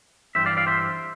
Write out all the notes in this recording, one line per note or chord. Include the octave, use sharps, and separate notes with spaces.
G2 E3 G3 C5 E5
D5 F5
D5 F5
C5 E5